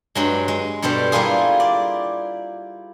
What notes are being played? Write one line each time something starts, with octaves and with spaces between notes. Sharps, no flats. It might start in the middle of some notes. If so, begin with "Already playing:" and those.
G2 F#3 G#3
G#3
G2 B2 G3 A4 C5
G3 A#3 E4 F4 G#4
D5